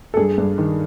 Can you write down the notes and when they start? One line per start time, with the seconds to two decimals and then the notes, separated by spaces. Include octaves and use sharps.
0.14 A4
0.17 G2 G#4
0.38 G2
0.58 D#3